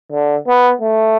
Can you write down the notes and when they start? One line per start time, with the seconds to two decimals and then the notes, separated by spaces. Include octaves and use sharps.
0.12 D3
0.47 B3
0.81 A3